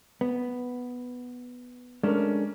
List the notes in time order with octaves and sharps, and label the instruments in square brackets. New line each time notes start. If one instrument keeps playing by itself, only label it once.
[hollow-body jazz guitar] B3
[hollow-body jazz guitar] G#3 A3 D4 [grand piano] C#4 A#4